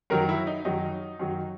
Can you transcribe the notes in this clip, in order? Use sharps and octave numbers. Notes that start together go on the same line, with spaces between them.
F#2 D#3 F#3 A#4
E4
D#4
F#2 D#3 F#3 D#4
F#2 D#3 F#3